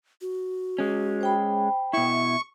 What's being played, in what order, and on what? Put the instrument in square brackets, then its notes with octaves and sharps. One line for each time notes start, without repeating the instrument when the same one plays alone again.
[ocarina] F#4
[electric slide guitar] G#3 C#4
[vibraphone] C5 G5 B5
[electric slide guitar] B2 E4 [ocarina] E5 [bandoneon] C#6